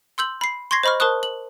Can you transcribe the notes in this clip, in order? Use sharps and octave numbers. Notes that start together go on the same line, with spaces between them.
C6 E6 G6 F#7
B5 C7
C6 C#6 G#6 A#6 C7
C5 D#5 B5 C#6 F6
A#4 C5 A5 C#6 D#6 F#6
F#7